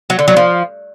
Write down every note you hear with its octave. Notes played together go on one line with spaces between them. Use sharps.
F#3
D3
F#3
F3